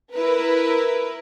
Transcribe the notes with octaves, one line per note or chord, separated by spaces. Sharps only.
E4 A#4 B4